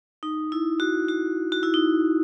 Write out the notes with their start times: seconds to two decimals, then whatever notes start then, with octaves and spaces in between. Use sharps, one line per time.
0.23 D#4
0.52 E4
0.80 F#4
1.09 F#4
1.52 F#4
1.63 E4
1.74 D#4